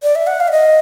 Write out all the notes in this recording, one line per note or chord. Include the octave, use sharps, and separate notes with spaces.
D5
E5
F#5
F5
E5
D#5